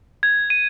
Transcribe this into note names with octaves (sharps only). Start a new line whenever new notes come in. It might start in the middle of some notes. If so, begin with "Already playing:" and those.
G#6
D#7